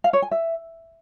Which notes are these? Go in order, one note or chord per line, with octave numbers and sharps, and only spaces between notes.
F5
C#5
G#5
E5